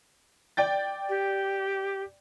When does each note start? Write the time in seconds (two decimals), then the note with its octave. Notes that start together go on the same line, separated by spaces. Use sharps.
0.57 D5 G5 A6
1.08 G4